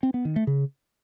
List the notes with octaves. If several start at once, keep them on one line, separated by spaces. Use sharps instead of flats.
C4
B3
D#3
A3
C#3